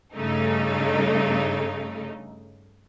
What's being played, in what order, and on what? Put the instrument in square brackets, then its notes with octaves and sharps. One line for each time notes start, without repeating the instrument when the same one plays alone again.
[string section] G2 C#3 A3 D#4